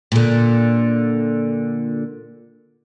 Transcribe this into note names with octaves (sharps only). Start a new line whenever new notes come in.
A#2 D3